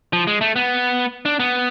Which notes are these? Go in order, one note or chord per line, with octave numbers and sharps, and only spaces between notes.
F3
G#3
A3
B3
D4
B3